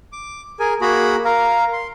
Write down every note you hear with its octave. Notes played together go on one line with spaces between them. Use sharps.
D6
G#4 A#4 G#5
A#3 F#4 G#4 A#5 B5
A#4 F5 A#5
C6